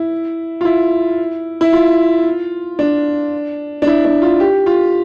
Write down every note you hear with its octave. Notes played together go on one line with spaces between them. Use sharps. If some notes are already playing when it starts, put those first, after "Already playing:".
Already playing: E4
F4
E4
E4
F4
D4
D4
E4
D4
F4
G4
F4